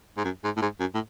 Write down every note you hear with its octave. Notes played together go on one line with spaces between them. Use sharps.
G#2
F#2
G#2
A2
G#2
F#2
A2